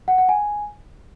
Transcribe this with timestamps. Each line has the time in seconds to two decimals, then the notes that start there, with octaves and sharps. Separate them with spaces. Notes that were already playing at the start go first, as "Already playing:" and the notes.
0.08 F#5
0.18 F#5
0.29 G#5